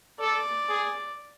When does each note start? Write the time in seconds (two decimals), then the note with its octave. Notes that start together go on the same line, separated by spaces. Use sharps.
0.20 A4 D5
0.69 G#4